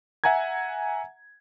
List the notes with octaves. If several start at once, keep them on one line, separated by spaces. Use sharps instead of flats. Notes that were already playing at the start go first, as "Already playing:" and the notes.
E5 F#5 G#5 A#5 G#6